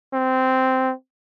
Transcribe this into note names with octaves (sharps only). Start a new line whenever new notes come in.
C4